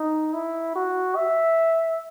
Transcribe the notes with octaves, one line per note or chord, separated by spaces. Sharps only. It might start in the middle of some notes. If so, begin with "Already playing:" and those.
Already playing: D#4
E4
F#4
E5